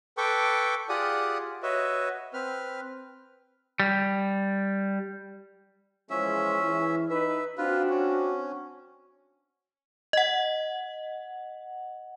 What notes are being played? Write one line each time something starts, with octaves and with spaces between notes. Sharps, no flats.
A4 B4 G5 C#6 D6
F4 G4 G#4 D5 F#5 D#6
F#4 B4 C#5 D#5 E5
C4 B4 F6
G3
E3 F3 G#3 C#4 E5
E3
D#4 B4 E5
C4 D4 F4 F#4 B4
C#4
D#5 F#5